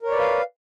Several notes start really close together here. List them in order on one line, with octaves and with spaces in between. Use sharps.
A#4 C#5 D5 B4 F5